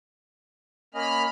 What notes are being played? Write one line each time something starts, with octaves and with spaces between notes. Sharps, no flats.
A#3 C#4 D#5 B5 F6